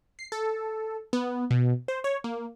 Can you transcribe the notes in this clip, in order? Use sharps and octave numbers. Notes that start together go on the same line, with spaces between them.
C7
A4
B3
B2
C5
C#5
A#3